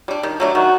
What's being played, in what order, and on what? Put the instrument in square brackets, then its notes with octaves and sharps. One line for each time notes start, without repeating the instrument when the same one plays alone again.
[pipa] G3 D4
D#3
F#3 A3 D4
[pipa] D#3 [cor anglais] F#4